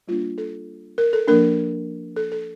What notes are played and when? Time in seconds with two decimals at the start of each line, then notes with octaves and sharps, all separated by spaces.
0.08 G3 A#3 D4 F4
0.38 A4
0.98 A#4
1.13 A4
1.28 F3 A#3 D4 A#4
2.16 A4
2.32 A4